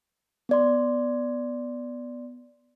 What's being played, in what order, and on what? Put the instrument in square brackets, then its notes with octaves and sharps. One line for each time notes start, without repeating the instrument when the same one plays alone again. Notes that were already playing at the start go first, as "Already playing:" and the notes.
[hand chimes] B3 D5 C6